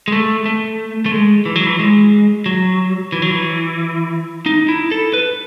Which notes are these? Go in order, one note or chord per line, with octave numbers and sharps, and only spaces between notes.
G#3
A3
A3
A3
G#3
E3
F#3
E3
G#3
F#3
E3
F#3
E3
D#4
E4
A4
B4